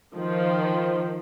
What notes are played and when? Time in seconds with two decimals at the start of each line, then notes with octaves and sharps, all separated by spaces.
0.15 D#3 F3